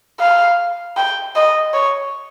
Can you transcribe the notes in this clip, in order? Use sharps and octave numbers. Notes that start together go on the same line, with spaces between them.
F5
G5
D#5
C#5